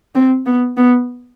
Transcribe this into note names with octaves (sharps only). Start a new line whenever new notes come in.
C4
B3
B3